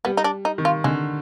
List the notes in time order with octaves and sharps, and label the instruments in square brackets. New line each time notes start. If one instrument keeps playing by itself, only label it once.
[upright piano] G3 [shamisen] B3
[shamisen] D#4
D4
D#4
[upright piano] D#3
[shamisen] F4
[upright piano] D3 [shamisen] G#3